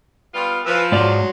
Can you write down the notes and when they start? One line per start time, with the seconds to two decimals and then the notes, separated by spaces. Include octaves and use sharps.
0.34 G3 B3 F4
0.66 F3 B4 E6
0.92 G#2 F#3 D5 C6